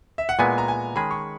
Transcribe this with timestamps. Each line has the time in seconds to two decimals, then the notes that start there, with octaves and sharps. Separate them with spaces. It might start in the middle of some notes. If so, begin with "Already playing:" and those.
0.18 E5
0.29 F#5
0.39 A#2 G#3 B3 E4 G#5
0.58 A#5
0.68 G#5
0.96 D#3 G#3 C#4 G#4 B5
1.11 C#6